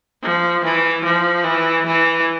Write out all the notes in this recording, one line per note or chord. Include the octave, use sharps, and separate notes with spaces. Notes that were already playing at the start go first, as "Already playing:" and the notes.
F3
E3
F3
E3
E3